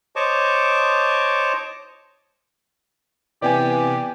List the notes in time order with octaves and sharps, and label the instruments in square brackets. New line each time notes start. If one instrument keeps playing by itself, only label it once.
[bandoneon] C5 C#5 D#5 A5 C#6 D6
[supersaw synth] C3 B3 [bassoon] E3 [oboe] G4 [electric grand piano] D5 G5 G#5